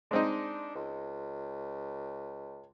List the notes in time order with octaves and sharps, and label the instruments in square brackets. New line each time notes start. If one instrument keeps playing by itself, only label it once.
[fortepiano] G#3 C4 D#4 [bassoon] D4
[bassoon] C#2